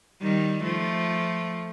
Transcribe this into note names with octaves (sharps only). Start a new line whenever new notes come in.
D#3 G3
F3 A3